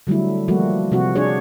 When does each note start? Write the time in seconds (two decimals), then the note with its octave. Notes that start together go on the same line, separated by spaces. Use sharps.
0.07 D3 F#3 G3 A3 E4
0.48 E3 F3 G3 A3 A#3 F#4
0.92 C3 F3 C4 F#4
1.15 D4 G#4 C#5